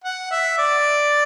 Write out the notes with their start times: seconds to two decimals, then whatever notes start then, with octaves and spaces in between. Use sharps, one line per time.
0.04 F#5
0.31 E5
0.58 D5